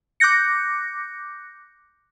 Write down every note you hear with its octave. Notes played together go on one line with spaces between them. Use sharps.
D6 F#6 G6 A#6 C#7